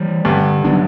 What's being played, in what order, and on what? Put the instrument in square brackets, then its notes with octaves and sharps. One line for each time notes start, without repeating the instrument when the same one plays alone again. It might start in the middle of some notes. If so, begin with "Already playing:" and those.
Already playing: [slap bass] E3 G3
[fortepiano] G2 [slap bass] D3
[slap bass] F#3 B3 D4